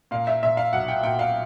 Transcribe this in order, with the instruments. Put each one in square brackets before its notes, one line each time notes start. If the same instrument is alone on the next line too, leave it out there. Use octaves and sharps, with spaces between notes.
[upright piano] A#2 F5
E5
A#2 E5
F5
B1 F#5
G5
A#2 G5
F5